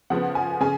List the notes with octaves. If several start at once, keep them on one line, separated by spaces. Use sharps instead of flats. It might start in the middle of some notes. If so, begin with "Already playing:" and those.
C#3 F3 B3 F#5
G#5
C#3 G#5